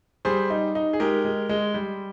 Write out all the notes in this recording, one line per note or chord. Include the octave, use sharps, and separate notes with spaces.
G3 G#4 C5
D#4
D#4
G#4
G#3 G4 A#4
G#3
G#3
G3